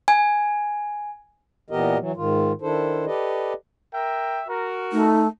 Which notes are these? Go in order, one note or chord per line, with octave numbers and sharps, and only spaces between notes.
G#5
A#2 E3 B3 G4 A#4 D#5
E3 F#3
G#2 D#3 F4
D#3 D4 E4 A4 C5
G4 A4 B4 D5 D#5
A#4 E5 G5
F#4 A#4
A3 D#4